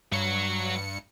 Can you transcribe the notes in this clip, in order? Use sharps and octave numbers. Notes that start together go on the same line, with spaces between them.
G2 F#3 C#5 C#7